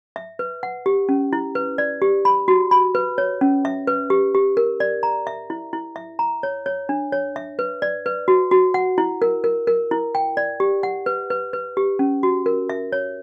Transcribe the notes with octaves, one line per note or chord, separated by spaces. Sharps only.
E5
B4
F#5
G4
C#4
E4
B4
D5
G4
B5
F#4
B5
B4
C#5
C#4
E5
B4
G4
G4
A#4
D5
A#5
E5
E4
E4
E5
A#5
C#5
C#5
D4
C#5
E5
B4
D5
B4
F#4
F#4
F#5
E4
A#4
A#4
A#4
E4
G5
D5
G4
F#5
B4
B4
B4
G4
C#4
F#4
A#4
E5
C#5